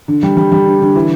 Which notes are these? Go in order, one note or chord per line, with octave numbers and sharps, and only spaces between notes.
D3
G3
G3
G3
D3
D3
E3